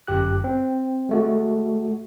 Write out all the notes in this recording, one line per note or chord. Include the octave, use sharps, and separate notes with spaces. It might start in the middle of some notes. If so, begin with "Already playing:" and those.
G1 F#2 G4 F#6
C4
G#3 A3 F#4